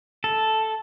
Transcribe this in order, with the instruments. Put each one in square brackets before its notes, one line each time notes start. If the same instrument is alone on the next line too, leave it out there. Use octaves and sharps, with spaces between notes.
[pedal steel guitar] A4